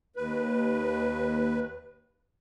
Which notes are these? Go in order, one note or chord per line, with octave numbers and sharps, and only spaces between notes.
D#2 B4